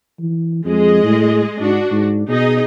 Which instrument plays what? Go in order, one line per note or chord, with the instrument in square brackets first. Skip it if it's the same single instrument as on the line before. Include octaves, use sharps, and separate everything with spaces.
[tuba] E3
[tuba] F2 [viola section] G#3 G#4 D#5
[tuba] A2
[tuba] G#2 [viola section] D4 F#4
[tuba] G#2
[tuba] B2 [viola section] D#4 G#4 D#5